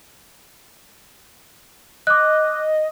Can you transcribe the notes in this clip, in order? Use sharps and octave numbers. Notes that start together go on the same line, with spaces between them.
D#5 D6 F#6